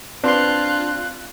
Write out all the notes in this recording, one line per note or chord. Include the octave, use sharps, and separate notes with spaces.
C4 D4 F4 B4 C6 F#6